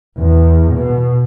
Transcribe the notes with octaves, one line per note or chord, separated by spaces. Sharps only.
E2
B2